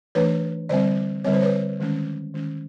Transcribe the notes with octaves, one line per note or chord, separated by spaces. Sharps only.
E3 A3 D4 B4 C#5
D3 G3 C4 C5 D5
D3 G3 C4 C#5
C5
B4 C#5
D#3 G#3 C#4
D#3 G#3 C#4